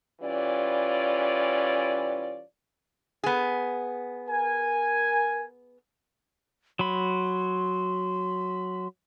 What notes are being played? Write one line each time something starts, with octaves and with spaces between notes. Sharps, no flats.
E3 G3 C#4 F4 D5
B3 G#4
A#4 G#5
F#3 B5 C6